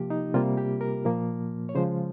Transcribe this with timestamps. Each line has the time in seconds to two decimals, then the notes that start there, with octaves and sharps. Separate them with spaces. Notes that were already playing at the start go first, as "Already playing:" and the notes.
Already playing: C3 F3 A#3 G4
0.10 D#4
0.34 C3 G3 A#3 F4
0.57 G4
0.81 A#4
1.05 A#2 F3 A#3
1.69 C#5
1.75 C#3 F3 G#3 C5